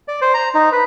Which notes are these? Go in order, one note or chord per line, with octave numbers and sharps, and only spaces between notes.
D5
C5
A#5
D#4
B4